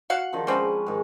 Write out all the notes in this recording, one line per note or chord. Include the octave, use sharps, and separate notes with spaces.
F#4 F5 F#5
D3 D#3 F3
G3 G#3 C4 C#4 B4
G#2 D#3